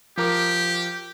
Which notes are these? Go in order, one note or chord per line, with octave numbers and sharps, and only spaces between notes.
F3 G4 A#4 D6